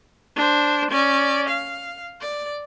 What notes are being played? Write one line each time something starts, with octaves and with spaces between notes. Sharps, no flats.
D4 C5
C#4 D5
F5
D5